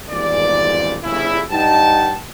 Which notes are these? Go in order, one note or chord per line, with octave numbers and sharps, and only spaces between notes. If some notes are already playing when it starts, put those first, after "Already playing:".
G#1 E2 G2 A#2 D5
G1 C#3 E4
G2 D#4 F#5 G5 A5